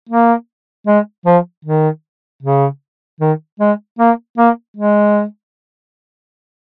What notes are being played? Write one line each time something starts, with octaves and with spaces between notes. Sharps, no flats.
A#3
G#3
F3
D#3
C#3
D#3
G#3
A#3
A#3
G#3